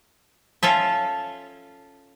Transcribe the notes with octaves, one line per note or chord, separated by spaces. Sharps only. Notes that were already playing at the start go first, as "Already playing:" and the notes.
C#4 F4 A4 E5